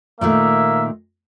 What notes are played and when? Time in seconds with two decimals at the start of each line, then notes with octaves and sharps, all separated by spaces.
0.21 A#2 D#3 A3 A#3 E5